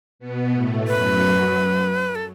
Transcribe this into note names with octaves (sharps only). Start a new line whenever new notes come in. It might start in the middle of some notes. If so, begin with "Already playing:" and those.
B2 B3
A2 A3
F#2 F#3 B4
A4